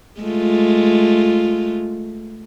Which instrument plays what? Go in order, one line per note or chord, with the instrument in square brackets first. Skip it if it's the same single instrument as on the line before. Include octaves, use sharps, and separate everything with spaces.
[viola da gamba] G#3 A3 F4